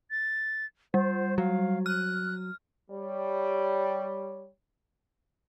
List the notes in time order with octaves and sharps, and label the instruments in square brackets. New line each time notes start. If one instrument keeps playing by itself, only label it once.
[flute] A6
[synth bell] G3 [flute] C5
[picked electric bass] F#3 [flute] F5
[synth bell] F6 [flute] F#6
[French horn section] G3 C#5